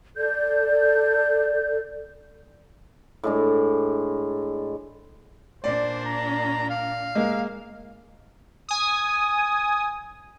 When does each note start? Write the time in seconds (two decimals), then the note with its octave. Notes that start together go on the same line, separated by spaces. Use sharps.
0.16 A4 D5 G6
3.24 A2 G#3 D4
5.64 A#2 D4 C5 D5
6.05 A#5
6.70 F5
7.15 G#3 A#3
8.69 G#5 D#6